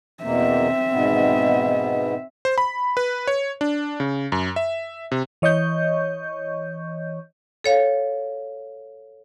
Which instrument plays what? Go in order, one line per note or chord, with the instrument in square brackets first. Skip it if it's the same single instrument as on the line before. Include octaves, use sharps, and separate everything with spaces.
[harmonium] E2 B2 A#3 [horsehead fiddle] C4 E5
[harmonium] G#2 B2 B3
[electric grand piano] C5
B5
B4
C#5
D4
C#3
F#2
E5
C3
[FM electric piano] E3 C#5 D#5 C#6 G6
[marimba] A4 C#5 F5